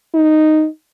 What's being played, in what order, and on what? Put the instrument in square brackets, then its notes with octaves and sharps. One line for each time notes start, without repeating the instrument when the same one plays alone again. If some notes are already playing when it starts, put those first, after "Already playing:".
[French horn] D#4